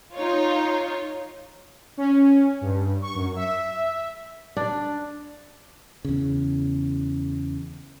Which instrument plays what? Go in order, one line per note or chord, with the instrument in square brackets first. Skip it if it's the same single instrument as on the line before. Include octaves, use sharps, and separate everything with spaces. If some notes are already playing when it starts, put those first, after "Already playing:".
[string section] D#4 F4 C#5
[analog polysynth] C#4
G2
C#6
F#2
E5
[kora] D4
[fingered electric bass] E2 C#3